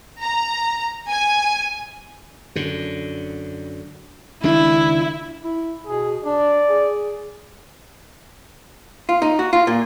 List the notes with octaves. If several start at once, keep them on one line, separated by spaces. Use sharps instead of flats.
A#5
G#5
F#2 D3
C#2 D#3 D4 E4
E4
B2 G#4
D4 D5
G#4
F4
D#4
F#4
F4
A#2